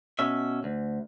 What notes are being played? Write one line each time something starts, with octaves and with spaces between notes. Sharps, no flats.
B2 C#4 E5
D2